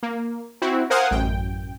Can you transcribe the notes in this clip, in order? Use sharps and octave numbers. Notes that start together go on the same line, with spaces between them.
A#3
C4 E4 F#4
A#4 C5 F5 F#5 G#5 D#6
A1 F#2 G5